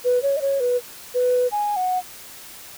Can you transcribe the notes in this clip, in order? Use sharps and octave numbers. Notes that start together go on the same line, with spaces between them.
B4
C#5
D#5
C#5
B4
B4
G#5
F#5